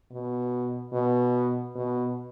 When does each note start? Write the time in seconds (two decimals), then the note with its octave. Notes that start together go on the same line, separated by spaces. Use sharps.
0.12 B2
0.93 B2
1.75 B2